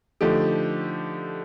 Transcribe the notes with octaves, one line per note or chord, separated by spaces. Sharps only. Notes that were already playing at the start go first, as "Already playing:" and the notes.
D3 F3 A3 D#4 G4